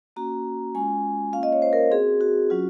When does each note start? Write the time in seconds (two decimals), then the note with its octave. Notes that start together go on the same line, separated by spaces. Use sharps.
0.16 A#3 C#4 F#4 A#5
0.75 G#3 C#4 F4 G#5
1.33 A#3 C#4 F4 F5
1.43 D#5
1.53 C#5
1.62 C5
1.73 A#4
1.91 C4 F#4 G#4
2.21 F#4
2.50 F#3 C#4 F4